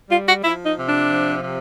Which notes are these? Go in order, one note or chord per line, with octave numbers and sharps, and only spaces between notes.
G3 F4
F#4
F3 E4
D#4
C3
D4
F3
C3